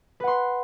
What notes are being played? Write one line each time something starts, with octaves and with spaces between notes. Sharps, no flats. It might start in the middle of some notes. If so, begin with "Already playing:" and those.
B4 F#5 C6